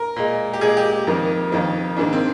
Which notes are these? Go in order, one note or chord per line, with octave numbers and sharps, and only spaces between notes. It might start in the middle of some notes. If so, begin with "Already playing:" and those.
Already playing: A#4
A#2 G#3
G4
A#2 G#3 G#4
G4
G4
F2 D#3 A#3 A#4
F2 D#3 A#3
G#2 D#3 A#3 D4
C4